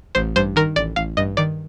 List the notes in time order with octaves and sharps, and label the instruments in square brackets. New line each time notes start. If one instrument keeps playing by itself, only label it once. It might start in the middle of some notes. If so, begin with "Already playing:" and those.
[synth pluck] A1 C5
G2 C5
D#3 A#4
A1 D5
A1 F5
G2 D#5
D#3 D5